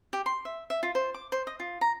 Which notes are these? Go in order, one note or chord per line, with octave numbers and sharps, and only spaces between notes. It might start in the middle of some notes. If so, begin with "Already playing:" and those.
G4
C6
E5
E5
F4
C5
D6
C5
D#5
F4
A#5